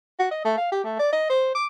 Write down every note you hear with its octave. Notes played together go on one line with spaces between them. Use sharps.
F#4
D#5
A3
F5
G4
A3
D5
D#5
C5
D6